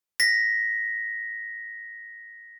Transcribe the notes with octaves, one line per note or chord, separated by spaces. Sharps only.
A#6 B6